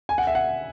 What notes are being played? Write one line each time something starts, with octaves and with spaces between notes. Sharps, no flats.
G#5
F#5
E5
F#5